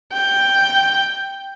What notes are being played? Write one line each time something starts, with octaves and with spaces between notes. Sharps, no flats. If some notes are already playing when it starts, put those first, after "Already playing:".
G5